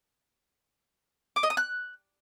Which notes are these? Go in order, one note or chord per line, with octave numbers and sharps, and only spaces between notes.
D6
D#5
D#6
F#6